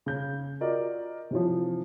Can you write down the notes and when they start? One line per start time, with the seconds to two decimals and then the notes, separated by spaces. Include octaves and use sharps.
0.06 C#3 G6
0.61 F4 F#4 A#4 D5 D#5
1.31 C3 E3 F3